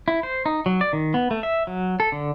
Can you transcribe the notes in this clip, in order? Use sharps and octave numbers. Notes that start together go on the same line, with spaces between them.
E4
C5
D#4
F#3
D5
D#3
B3
A3
E5
F#3
A4
D3